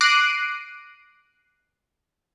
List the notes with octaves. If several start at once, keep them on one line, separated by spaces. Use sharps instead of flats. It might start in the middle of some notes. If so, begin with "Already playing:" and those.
D6 F#6 A#6 C7 D7 D#7